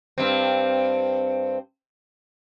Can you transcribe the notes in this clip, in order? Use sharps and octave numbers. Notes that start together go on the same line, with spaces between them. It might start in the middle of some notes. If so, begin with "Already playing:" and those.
G2 C4